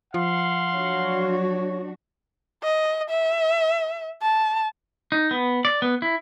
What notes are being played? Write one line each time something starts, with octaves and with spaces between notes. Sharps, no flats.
F3 F5 F#5 C6
F#3 D4 F#4 C#5
D#5
E5
A5
D#4
B3
D5
B3
E4